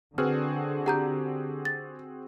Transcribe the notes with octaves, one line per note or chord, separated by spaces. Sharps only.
D3 C4 F#4 G#4 B4 F6
G4 F#5 A#5 G6
A6